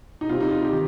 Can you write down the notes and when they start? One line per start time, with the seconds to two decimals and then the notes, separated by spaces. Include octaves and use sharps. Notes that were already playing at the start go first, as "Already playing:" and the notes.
0.21 D#4
0.29 C3 G3 C4 F4
0.40 D#4
0.51 F4
0.62 G4
0.72 D#3